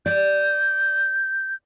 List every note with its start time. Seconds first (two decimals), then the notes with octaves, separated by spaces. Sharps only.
0.06 D5 G6